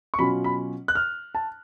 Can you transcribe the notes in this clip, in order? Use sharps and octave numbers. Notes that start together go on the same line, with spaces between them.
C#6
B2 F#3 C#4 F4 B5
B5
F#6
F6
A5